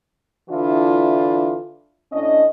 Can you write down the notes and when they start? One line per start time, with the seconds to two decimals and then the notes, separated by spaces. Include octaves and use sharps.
0.49 D3 E3 D4 E4 F4
2.12 A2 C#4 D4 D#5